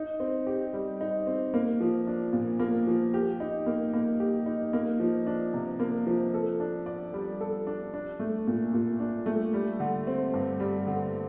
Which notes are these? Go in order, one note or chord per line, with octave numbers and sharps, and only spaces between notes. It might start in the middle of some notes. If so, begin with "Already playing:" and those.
Already playing: D#4
C4
G4
G3
D#4
C4
A#3
F3
D4
A#2
A#3
F3
G4
D#4
A#3
A#3
G4
D#4
A#3
F3
D4
C3
A#3
F3
A4
D4
D5
G3
A4
D4
D4
A3
A#2
A#2
D4
A3
G3
D3
C4
G2
G3
D3